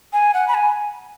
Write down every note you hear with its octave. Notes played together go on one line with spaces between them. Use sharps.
G#5
F#5
B5
G#5